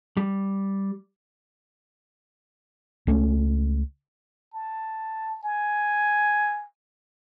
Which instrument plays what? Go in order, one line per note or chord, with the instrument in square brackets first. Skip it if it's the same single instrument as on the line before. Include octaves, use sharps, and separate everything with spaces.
[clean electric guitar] G3
[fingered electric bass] C#2 A3 C4 C#4
[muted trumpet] A5
G#5